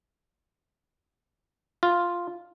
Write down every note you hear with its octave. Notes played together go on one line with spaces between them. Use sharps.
F4